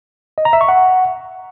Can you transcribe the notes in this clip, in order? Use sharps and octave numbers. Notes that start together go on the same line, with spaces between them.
D#5
A#5
E5
C#6
F#5